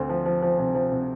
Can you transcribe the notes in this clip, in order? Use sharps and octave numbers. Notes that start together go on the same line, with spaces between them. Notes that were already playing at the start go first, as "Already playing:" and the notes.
Already playing: D2 C4
F3
F3
F3
C3
F3
C3